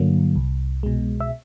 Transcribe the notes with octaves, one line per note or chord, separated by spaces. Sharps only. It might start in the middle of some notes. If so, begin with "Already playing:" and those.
Already playing: G2 D3 F#3 A#3
C2
B2 G#3
E5